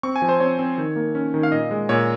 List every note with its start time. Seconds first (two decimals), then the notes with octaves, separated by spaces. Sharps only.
0.03 C4 C#6
0.16 G#5
0.22 F3
0.29 C5
0.40 C4 C#5
0.59 C4
0.78 D#3
0.96 A#3
1.15 C#4
1.34 D#3
1.43 F5
1.52 A#2 D#5
1.71 G#3
1.89 A#2 C#5